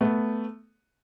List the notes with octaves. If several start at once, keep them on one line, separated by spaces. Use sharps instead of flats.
A3 B3